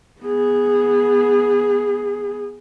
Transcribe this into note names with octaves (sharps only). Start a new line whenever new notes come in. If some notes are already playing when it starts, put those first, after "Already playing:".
B3 G#4